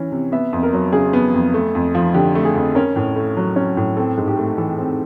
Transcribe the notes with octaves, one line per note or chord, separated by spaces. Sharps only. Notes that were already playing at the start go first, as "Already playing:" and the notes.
Already playing: E3 C#4
C3
B3 E5
F2
A#4
F#3
C#3 G#4
B3
F2
A3
F2
F3
D3 G4
A3
G#4
F2
C#4 A#4
A2
A3
F#3
C#4
A2
C4 A4
G#2
G4
A3
E3 A4
C4